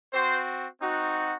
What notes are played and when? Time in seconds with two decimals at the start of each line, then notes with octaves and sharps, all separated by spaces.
0.13 C4 F#4 C5
0.81 C4 D#4 F#4